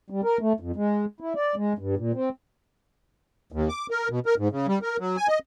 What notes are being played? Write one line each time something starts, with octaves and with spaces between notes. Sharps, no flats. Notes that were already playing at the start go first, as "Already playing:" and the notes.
G3
A#4
A3
F2
G#3
E4
D5
G#3
G2
A#2
C4
D#2
D6
A#4
B2
A#4
G#2
C#3
G3
A#4
F#3
G#5
D#5